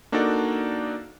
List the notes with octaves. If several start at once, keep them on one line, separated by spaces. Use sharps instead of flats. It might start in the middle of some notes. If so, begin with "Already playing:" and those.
A#3 D4 D#4 F#4 A4 D5